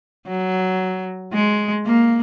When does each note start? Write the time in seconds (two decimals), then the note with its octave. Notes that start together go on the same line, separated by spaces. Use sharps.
0.27 F#3
1.34 G#3
1.87 A#3